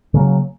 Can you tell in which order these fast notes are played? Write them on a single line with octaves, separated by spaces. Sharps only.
C#3 A#3 F#3